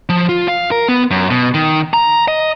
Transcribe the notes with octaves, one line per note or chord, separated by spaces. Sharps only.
F3
F4
F5
A#4
B3
F#2
B2
D#3
A#5
D#5